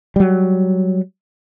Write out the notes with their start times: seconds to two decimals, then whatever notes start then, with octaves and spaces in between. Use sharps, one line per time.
0.16 F#3 G3